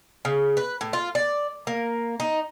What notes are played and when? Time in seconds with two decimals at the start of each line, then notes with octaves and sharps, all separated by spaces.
0.25 C#3
0.57 B4
0.81 A2
0.93 F4
1.15 D5
1.67 A#3
2.20 D#4